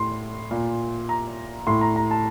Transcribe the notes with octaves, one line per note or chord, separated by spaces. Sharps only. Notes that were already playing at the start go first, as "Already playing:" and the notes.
Already playing: A2 C6
A#2
A#5
A2 C6
A#5
A#5
A5